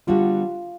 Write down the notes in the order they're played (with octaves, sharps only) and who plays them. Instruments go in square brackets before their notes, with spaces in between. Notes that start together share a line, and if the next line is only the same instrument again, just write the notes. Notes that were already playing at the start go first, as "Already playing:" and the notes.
[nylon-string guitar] D3 G3 B3 D4 F#4 [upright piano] F4